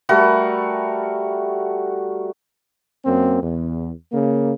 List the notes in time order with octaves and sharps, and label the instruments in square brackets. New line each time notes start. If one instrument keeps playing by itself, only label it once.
[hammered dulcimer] G3 A3 F#4 A#4
[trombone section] F#2 A#3 C4
E2
C#3 A#3